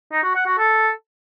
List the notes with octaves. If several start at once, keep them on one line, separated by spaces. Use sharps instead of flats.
D#4
F#4
F#5
F#4
A4